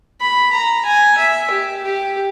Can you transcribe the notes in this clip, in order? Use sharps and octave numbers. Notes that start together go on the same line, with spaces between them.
B5
A#5
G#5
E5
G4
G4